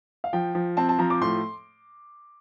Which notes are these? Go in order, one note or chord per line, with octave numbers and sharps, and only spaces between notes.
F5
F3 G5
F3
C4 A5
A5
F3 A#5
D6
A2 C6